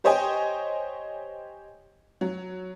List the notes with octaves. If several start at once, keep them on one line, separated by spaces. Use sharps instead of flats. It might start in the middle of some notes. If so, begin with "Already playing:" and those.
G4 C5 C#5 D#5 G5 G#5
F#3